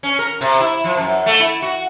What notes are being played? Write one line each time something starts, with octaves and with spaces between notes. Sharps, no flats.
C#4
A#4
C3
E4
F3
F#2
A3
E4
F#4